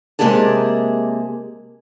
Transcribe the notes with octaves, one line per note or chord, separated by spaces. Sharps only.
C3 G#3 A#3 G4 G#4 A5